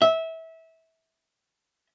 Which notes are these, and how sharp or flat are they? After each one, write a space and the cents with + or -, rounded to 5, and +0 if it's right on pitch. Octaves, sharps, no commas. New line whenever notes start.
E5 -20